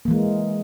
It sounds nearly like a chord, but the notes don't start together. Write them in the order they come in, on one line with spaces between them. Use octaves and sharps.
A#3 E3 G#3